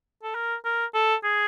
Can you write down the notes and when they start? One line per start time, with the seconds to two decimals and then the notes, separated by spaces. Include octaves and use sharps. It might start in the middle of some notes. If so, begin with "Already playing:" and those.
0.23 A4
0.35 A#4
0.65 A#4
0.94 A4
1.24 G#4